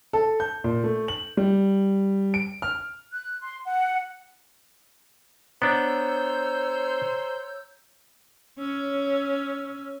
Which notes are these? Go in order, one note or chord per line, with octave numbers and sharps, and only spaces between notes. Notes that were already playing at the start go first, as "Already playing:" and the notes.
A4
G6
A#2
A3
F#7
G3
D7
F6
F#6
C6
F#5
B3 D4 C5 C#5 A#5 E6 G6
C#4 C#5 E6 F6